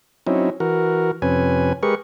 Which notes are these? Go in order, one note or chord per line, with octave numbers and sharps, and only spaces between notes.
F#3 C4 C#4 D#4 E4
E3 F#4 A#4
F2 C3 C#4 B4 G#5
G#3 G4 G#4 A#4 B4 C#6